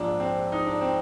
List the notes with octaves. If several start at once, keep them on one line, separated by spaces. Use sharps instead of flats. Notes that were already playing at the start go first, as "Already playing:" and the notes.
Already playing: A#1 G#2 F3 G#3 D4
C4
D#4
D4
C4